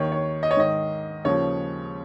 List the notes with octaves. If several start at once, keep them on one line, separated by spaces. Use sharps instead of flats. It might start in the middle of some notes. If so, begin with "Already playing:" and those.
Already playing: D#2 D#3 C#5
C#5
D#5
C#5
G#2 D#3 D#5
D#2 C#3 F3 C#5